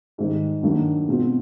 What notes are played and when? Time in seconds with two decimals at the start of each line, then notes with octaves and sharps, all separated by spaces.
0.18 G#2 D#3 G3
0.62 G2 D#3 F#3 A#3
1.08 B2 G#3 C4 F4